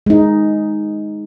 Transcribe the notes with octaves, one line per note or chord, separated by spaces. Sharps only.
G#3 D#4